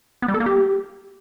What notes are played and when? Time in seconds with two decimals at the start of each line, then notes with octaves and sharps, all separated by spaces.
0.22 B3
0.28 G3
0.34 A4
0.40 A#3
0.46 G4